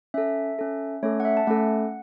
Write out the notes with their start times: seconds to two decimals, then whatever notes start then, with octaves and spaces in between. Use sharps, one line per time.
0.14 C#4 A4 E5
0.59 C#4 A4
1.03 A3 C#4 A4 C#5
1.20 F#5
1.25 E5
1.37 A5
1.47 A3 C#4 A4 F#5